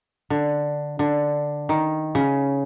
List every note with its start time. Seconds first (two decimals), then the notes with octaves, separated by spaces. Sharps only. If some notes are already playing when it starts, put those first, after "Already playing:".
0.30 D3
0.99 D3
1.69 D#3
2.15 C#3